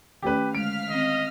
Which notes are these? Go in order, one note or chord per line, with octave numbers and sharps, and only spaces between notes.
D#3 A3 C#4 G4 B4
D3 G#3 F5 F6 B6 D7
D#3 C4 D#5